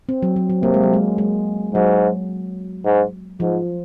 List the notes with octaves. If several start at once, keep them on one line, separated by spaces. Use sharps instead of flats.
C4
F#3
F#3
F#3
C3 A#3
G#3
F#3
G#3
G#3
G#2 F#3
G#2
G#2 F3